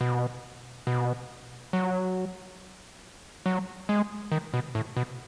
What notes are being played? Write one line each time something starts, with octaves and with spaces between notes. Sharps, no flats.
B2
B2
F#3
F#3
G#3
D#3
B2
A2
B2